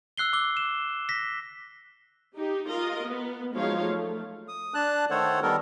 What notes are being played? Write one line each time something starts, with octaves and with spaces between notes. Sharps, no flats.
E6 F#6 C7 G7
D6 E6 G7
E7
A#6 B6
D#4 G4
F4 A#4 D#5
B3
F3 F#3 G#3 D#4 C#5 F5
A3
D#6
D4 A5 F#6
D#3 A3 A4 C5 C#5 F#5
D#3 G3 B3 A4 A#4